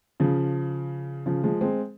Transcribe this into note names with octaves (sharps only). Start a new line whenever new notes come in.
C#3 F3
C#3 F3
F3 G#3
G#3 C4